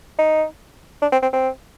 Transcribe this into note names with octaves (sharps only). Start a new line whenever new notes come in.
D#4
D4
C4
C4
C4